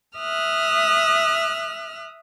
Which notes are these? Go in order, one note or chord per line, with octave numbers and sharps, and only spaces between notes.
E5 D#6 F6 F#6